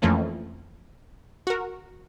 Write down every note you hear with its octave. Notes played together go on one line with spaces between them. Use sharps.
F2 E3 F3 A3 A#3 C#4
F#4 A#4